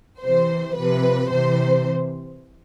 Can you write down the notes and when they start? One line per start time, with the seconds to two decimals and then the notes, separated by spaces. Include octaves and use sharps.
0.22 C3 E3 C5
0.76 C3 F3 B4
1.31 C3 E3 C5